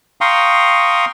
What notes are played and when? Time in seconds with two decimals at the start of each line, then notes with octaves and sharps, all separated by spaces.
0.21 F5 G5 A#5 C6 C#6 D#6